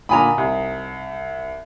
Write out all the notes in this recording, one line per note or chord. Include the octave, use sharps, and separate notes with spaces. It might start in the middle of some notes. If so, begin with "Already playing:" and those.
A#2 D3 D#4 G#5 A#5 B5
C2